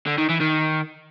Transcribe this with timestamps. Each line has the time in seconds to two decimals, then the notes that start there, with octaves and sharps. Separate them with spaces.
0.06 D3
0.18 D#3
0.29 E3
0.41 D#3